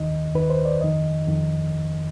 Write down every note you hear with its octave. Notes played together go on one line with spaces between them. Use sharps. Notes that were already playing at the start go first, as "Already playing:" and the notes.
Already playing: D#2 D#3 D#5
D#2 D#3 B4
C5
D5
F2 D#3 D#5
F2 D#3